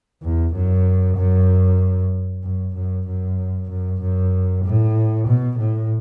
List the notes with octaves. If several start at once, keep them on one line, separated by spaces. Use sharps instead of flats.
E2
F#2
F#2
F#2
F#2
F#2
F#2
F#2
A2
B2
A2